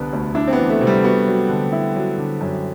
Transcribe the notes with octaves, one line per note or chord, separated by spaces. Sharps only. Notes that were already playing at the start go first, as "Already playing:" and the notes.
Already playing: C2 D3 B3
D2
D4 E4
C4
B3
E3
A3
C3
G3
B3 F#4
F#3
D3
E4
F#3
D3
F#2